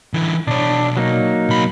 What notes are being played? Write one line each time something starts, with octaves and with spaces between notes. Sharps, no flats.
D3 E3
B2 D4 C#5
F#3 A#3 D#4
B1 B5